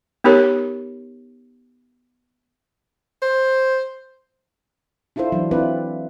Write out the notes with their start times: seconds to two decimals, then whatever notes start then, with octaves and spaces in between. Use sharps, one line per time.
0.24 B3 D#4 G4 A#4 C#5
3.22 C5
5.16 D4 E4 F4 A4 C5
5.32 E3 F#3 D4
5.51 C4 D4 E4 F4 B4 D5